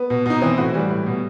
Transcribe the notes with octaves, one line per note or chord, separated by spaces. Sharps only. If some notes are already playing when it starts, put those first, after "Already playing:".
Already playing: B3
B2
B2 D#4
E3 C4
A2 F#4
E3 G3
A2
B2